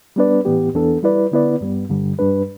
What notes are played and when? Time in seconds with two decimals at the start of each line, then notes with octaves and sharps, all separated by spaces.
0.16 G3 B3 D4 B4 D5
0.45 A2 E3 B3 G4
0.74 E2 E3 B3 D4 A4
1.03 G3 E4 B4 D5
1.32 D3 B3 E4 B4 D5
1.61 G2 G3 B3
1.89 G2 D3 G3
2.19 G2 G3 D4 B4